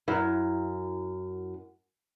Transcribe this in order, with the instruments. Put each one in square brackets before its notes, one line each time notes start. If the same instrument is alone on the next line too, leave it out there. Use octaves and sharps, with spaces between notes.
[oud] F#2 E4